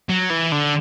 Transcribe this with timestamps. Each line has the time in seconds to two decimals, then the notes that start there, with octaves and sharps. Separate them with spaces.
0.09 F#3
0.30 E3
0.52 D3